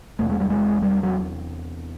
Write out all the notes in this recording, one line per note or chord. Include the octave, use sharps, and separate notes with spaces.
E2 C3 A3
G#3
G3
G#3
G3
F#3